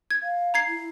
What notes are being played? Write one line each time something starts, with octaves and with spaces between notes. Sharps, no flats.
G#6
F5
A#5 G#6 C7
E4